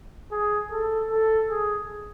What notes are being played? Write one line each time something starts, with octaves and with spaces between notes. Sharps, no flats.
G#4
A4
A4
G#4